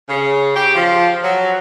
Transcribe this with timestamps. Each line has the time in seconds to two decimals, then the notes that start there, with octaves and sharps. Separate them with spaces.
0.08 C#3
0.55 G4
0.75 F3
1.23 F#3